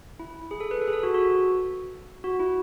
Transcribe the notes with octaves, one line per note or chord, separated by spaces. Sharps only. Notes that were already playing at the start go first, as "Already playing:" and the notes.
E4
G#4
A4
B4
A4
G#4
A4
F#4
F#4
F#4
E4